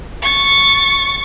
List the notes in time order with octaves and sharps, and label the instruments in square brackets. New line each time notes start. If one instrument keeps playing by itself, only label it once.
[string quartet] C#6 A6